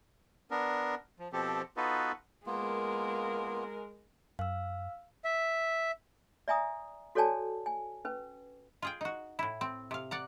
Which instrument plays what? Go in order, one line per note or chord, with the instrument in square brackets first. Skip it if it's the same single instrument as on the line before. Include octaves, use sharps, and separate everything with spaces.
[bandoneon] B3 D4 A#4
F3
B2 F3 C4 G4 A4
B3 D#4 F4 F#4 A4 B4
[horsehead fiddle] G#3 A#4 [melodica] A#3 B3 F4
[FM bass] F#2 [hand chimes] F5 E6
[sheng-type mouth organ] E5
[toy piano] D5 E5 G#5 A#5 D#6
F#4 A4 C#5 D5 G#5 A5
G#5
C#4 B4
[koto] F4 G#4 G5
D#4 F#4
A2 E4
C4
C3 F5
D5 F#5 A#5